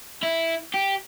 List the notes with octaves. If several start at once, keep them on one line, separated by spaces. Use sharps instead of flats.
E4
G4